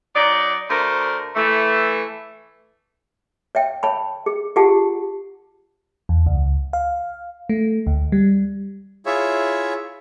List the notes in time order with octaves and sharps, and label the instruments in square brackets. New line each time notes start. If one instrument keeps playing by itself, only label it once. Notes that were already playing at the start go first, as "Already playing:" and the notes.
[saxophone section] F#3 D#4 D5
D2 A3 A#4 C5
E3 A3
[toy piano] C#5 E5 G5
C#5 A5 B5
G#4
F4 G4 G#4 F#5 A5
[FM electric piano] E2
C#2
F5
A3
D2
G3
[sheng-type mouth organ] E4 F4 G#4 C#5 E5